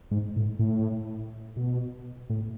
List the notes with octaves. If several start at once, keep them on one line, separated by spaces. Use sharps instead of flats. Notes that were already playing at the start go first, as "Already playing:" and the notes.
G#2
A2
A2
B2
A2